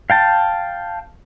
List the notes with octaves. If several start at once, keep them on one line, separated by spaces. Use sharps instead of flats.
F5 G5 A5